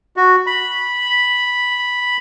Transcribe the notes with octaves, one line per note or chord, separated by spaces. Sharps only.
F#4
B5